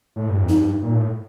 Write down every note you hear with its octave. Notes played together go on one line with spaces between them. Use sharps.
A2
G2
F2
D#4
G2
A#2
A2